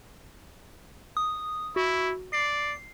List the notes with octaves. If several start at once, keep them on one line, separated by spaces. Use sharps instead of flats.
D#6
E4 F#4
D5 C7